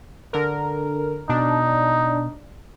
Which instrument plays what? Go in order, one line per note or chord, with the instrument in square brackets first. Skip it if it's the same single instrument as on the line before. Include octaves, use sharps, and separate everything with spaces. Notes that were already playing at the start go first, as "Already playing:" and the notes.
[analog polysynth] D3 A#4
[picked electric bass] B2 [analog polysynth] D4 [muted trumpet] D#4